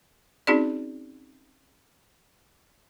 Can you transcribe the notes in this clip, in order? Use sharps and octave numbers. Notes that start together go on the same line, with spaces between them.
C4 C#4 D#4 F#4 G#4 D5